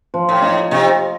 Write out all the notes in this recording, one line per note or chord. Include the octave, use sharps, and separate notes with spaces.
F3
A2
D#4
C3 D#4